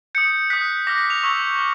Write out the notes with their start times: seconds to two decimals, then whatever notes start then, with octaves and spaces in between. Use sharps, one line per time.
0.15 D#6 G6 C#7
0.50 D#6 F#6 B6
0.87 D6 F6 A#6
0.98 B6
1.10 F7
1.23 C#6 E6 G6
1.58 F6